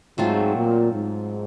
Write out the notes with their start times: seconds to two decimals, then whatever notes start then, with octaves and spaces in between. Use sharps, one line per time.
0.18 G#2 F#3 A3 C4 F4
0.55 A#2
0.92 G#2